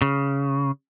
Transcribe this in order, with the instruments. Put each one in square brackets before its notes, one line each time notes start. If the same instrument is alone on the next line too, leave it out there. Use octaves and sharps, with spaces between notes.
[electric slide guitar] C#3